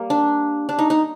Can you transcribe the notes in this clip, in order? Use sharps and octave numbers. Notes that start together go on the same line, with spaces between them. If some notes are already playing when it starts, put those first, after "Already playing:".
Already playing: G3 A#3
D4
D4
D#4
D#4